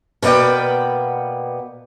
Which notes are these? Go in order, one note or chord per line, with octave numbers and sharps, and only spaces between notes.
B2 A#3 B3 D5 G5